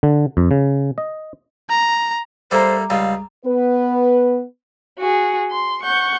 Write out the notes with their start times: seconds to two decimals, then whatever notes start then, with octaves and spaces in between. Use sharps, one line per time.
0.03 D3
0.37 F2
0.51 C#3
0.98 D#5
1.70 A#5
2.51 G3 A3 A#3 C5 A#5 D6
2.90 C#2 G3 F5
3.46 B3 B4
4.98 F#4 G#4
5.51 C6
5.83 F#5 C#6 G6